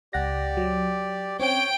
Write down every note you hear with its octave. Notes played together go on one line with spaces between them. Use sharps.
C#2 G4 D5 F#5 A#6
F#3
C4 C#4 C#5 G5 D7